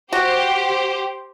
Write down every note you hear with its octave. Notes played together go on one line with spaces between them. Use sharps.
F#4 G4 C5